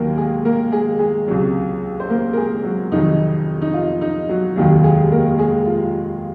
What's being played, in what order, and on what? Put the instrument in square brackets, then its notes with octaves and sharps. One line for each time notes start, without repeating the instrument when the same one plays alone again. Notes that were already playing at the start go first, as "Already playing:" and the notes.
Already playing: [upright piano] D#2 D#3 F#3 A#3 A#4
G#3 G#4
A#3 A#4
G#3 G#4
G#3 G#4
C#2 C3 F#3
C5
A#3 A#4
A#4
G#3 G#4
F#3 F#4
F1 F2 D#3 F#3 D#4
D#4
F4
D#4
F#3 F#4
F1 D#2 D#3 F#3 F#4
G#3 G#4
A#3 A#4
G#3 G#4
F4